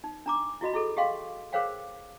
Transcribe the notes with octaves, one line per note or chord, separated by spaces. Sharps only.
D#4
D4 A#5 D6
E4 F#4 D#5 B5
E4 G#4 A4
G4 G#4 D#5 F5 G5 C6
G#4 A#4 C5 C#5 F5 G5